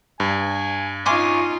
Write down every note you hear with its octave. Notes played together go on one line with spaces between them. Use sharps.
G2 G#5
C#4 D#4 F4 G#5 C6 D6